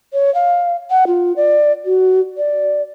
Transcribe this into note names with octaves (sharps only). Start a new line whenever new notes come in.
C#5
F5
F#5
F4
D5
F#4
D5